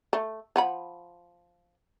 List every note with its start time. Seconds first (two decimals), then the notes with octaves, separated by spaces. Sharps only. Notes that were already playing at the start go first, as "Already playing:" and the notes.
0.13 A3
0.56 F3 F#5 B5